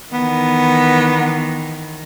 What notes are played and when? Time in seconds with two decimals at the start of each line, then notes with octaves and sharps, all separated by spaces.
0.13 D#3 E3 B3